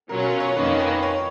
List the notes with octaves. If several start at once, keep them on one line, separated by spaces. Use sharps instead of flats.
B2 F#3 C#4 F4 A#4
A#4
C#5
F2 D#3 A#3 C#4 B4
B4
B4
C#5